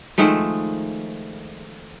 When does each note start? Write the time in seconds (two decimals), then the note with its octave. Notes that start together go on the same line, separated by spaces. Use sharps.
0.18 D#3 F3 G#3 A3